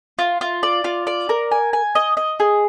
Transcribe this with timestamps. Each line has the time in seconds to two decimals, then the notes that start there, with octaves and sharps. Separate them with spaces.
0.19 F4
0.41 F4
0.63 D5
0.84 F4
1.07 D5
1.29 A#4
1.51 G#5
1.73 G#5
1.95 D#5
2.17 D#5
2.40 G#4